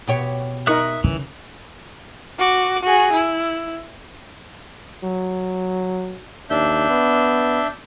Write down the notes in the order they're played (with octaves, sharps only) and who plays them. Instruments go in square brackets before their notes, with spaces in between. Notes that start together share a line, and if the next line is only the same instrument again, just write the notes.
[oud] B2 G4 C#5
[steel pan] D#4 A#4 C#6 [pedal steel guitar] E5 D#6 F#6
[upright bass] C#3 [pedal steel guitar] E3
[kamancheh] F#4 D6
F#4 G#4
E4
[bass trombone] F#3
[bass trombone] D#2 [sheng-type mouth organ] D4 E5 G6
[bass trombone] B3